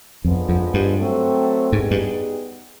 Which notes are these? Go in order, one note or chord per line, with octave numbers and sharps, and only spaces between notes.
F2 D3 F3 G#3 B3
F2
G2
F#3 A3 C4
G#2 G3 B3 D#4 G#4
G2